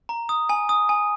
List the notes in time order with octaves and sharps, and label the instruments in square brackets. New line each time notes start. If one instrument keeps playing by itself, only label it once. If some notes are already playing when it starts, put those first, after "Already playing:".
[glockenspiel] A#5
D#6
G#5
D#6
G#5